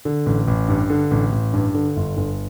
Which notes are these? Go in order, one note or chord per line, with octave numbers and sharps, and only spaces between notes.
D3
A1
A1
G2
D3
A1
A1
G2
D3
G1
G1